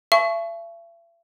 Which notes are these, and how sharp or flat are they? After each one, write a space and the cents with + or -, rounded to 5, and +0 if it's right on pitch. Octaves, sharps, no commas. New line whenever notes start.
E5 +40 A5 -40 C#6 +0